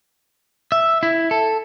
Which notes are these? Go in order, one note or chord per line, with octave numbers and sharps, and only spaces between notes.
E5
E4
A4